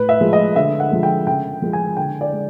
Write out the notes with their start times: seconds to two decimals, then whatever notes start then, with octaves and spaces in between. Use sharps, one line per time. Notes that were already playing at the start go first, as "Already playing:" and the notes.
Already playing: A2 B4
0.09 E5
0.21 F3 G#3
0.33 D#5
0.56 D3 E5
0.80 F#5
0.91 F3 G#3
1.03 G5
1.27 C#3 G5
1.62 F3 G#3
1.73 G#5
1.97 D3 G5
2.21 D5
2.33 G#3